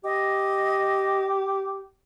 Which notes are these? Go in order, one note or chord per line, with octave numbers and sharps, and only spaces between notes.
G4 D#5